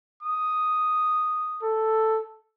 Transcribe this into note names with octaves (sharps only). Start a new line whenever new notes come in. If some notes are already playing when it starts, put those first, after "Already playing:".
D#6
A4